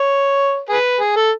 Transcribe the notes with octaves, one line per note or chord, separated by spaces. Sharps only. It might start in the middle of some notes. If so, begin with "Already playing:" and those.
Already playing: C#5
G#4 B4
G#4
A4